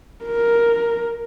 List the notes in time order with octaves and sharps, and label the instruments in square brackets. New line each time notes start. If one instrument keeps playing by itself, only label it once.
[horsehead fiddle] A#4